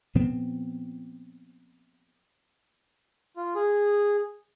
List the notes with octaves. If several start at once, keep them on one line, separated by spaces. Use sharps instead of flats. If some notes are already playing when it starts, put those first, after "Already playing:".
A#2 F3 B3 C4
F4
G#4